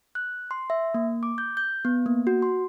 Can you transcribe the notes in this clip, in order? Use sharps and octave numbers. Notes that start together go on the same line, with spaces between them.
F#6
C6
E5
A#3
D6
G6
G6
B3
A#3
F#4
C6